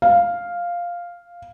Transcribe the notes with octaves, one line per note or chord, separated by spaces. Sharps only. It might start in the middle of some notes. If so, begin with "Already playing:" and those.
F5